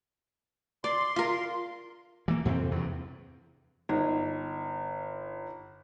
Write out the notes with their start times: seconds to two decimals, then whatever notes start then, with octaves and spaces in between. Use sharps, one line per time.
0.84 D5 C6
1.16 F4 A#4
2.28 E3 A#3
2.45 F2 C3 E3 C4
2.71 E2 G2
3.89 G1 D#4